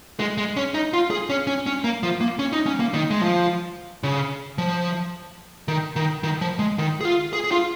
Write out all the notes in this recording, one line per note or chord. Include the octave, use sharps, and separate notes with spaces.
G#3
G#3
C#4
D#4
F4
G#4
C#4
C#4
C#4
A#3
F3
A#3
C#4
D#4
C#4
A#3
D#3
G#3
F3
C#3
F3
D#3
D#3
D#3
F3
G#3
D#3
G#4
F4
G#4
G#4
F4